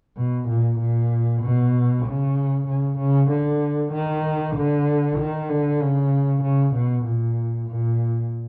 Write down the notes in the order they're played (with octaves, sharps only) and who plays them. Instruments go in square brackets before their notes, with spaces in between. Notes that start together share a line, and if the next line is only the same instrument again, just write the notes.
[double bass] B2
A#2
A#2
B2
C#3
C#3
C#3
D3
D#3
D3
D#3
D3
C#3
C#3
B2
A#2
A#2